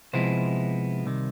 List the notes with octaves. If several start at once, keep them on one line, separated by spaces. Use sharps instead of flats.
C3 F3 G#3 B3 E4 C5
C2 C3 D#3